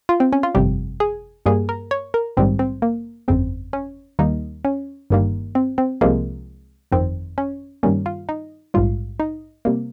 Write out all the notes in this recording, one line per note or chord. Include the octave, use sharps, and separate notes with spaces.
F4
C4
C#4
F4
G1 F2 C3 G3 G4
G#4
G2 G3 A#3 G#4
A#4
C#5
A#4
A#1 G#2 D#3 G3 C4
C4
A#3
G1 F2 C#3 C4
C#4
D#2 D#3 G3 A#3 D#4
C#4
G1 G2 D#3 G3 A#3
C4
C4
C2 C3 F3 G#3 A#3
G1 F2 D#3 C4
C#4
G2 D#3 G3 A#3 C#4
F4
D#4
A#1 G#2 G3 F4
D#4
C3 G3 A#3